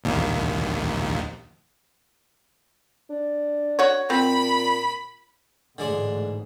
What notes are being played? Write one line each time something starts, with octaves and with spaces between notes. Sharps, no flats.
A#1 D#2
D4
F#4 C#5
A#2 C4 B5
A1 G#2 D3 G#3 D4